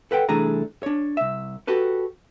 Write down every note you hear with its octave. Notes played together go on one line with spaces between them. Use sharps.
A4 B4 F#5 G5
C2 E3 A3 D4 G#4 A#5
D4 C#5
C2 E5
F#4 G4 A4 B4